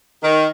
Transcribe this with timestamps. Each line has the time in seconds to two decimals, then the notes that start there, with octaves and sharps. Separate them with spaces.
0.23 D#3